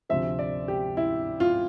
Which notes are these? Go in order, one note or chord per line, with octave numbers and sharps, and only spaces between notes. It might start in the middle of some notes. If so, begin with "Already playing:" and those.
D2 C3 F3 C4 E5
D5
G4
E4
F4